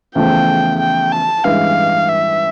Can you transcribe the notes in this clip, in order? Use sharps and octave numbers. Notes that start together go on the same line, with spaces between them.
E2 C#3 F3 A3 G5
G5
A5
A1 G2 E3 G#3 F5
E5